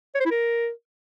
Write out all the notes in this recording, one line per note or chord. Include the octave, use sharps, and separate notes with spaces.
C#5
C5
E4
A#4